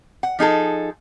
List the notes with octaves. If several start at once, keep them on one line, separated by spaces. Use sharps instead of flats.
F#5
F3 D#4 G#4 A4